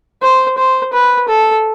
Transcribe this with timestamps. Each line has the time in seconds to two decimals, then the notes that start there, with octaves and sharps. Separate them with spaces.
0.23 C5
0.58 C5
0.93 B4
1.28 A4